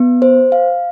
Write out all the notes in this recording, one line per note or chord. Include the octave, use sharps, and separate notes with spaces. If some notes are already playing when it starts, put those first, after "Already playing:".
Already playing: B3
C5
F5